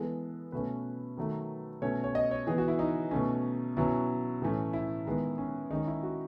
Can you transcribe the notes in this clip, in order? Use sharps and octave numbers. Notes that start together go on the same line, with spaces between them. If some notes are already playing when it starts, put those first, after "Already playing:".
Already playing: E3 G#3 B3 A4
B2 A3 C#4 B4
D#3 F#3 A3
B2 A3 C#4 C#5
C#5
D#5
C#5
E3 B3 G#4
F#4
E4
D#4
B2 A3 C#4
B2 F#3 C#4 E4
A2 E3 A3 C#4
E4
D#3 G#3 B3
C#4
D#3 G#3 C#4 D#4
E4
F#4